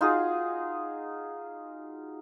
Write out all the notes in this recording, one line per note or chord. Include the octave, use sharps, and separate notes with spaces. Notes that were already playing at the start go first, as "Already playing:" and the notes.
D#4 F4 F#4 G#4